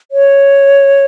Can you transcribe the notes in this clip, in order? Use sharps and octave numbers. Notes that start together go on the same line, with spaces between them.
C#5